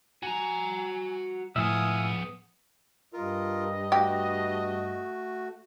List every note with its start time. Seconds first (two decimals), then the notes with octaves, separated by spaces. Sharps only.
0.23 F#4 G#5 A#5
1.56 A2 F3 B3 E5 F5 G#5 D#6
3.13 G2 F4 A#4 D#5
3.92 A3 F#4 G4